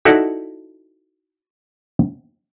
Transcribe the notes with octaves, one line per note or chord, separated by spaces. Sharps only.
D#4 E4 F#4 A4 D5